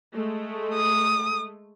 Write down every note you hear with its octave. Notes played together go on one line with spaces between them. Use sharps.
G#3 A3
D#6